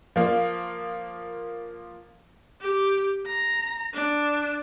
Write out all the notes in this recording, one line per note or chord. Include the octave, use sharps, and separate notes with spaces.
F3 A#3
G4
A#5
D4